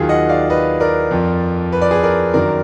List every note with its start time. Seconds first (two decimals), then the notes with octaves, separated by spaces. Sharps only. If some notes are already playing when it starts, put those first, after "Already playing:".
Already playing: D#2 D#3 F#3 F4 G#4
0.09 D#5 F#5
0.29 D5 F5
0.50 B4 D#5
0.80 A#4 D5
1.11 F2 F3
1.72 B4
1.82 D5
1.91 G#4 B4
2.03 A#4 D5
2.34 F#2 D#3 F#3 A#4 D5